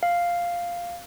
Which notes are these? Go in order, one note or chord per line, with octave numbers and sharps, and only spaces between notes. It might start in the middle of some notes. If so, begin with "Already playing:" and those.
F5